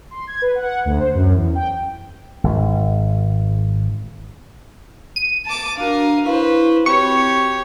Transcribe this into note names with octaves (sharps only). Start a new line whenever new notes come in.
C6
G#6
B4
F#5
D2
C5
F#2
E2
G5
G#1
D#7
A5 D6
D4 F#4 A#4 F5
E4 B4 C5 F5 C#6
C4 F#4 G4 C#5 B5 C#6